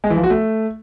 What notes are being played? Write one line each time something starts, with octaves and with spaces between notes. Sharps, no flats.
G#3
E3
F3
F#4
A3